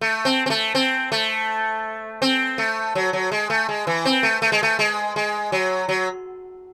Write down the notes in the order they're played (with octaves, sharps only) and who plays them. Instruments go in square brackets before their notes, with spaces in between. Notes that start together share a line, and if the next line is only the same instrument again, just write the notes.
[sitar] A3
C4
C4
A3
C4
A3
C4
A3
F#3
F#3
G#3
A3
G#3
E3
C4
A3
A3
G#3
A3
G#3
G#3
F#3
F#3